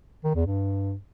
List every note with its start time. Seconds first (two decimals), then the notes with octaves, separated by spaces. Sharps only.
0.24 D#3
0.35 E2
0.47 G2